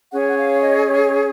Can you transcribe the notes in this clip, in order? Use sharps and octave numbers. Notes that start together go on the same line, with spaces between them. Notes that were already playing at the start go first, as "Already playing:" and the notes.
C#4 G#4 C#5 F#5
G#5
F#5
F5
D#5
C#5